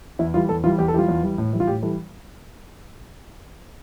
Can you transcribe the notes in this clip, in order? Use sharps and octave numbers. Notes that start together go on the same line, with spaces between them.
E2 E4
E3 G3 F4
E2 A4
E3 G3 F4
E2 G4
A4
E3 G3 F4 G4
E2
E3 G3
A2
E3 G3
F4
A2 G4
E3 G3 A4